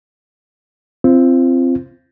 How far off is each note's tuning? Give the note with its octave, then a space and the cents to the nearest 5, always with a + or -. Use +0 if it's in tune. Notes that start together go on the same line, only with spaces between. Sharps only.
C4 +0 F4 -30